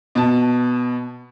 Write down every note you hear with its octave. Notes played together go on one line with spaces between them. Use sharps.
B2 A5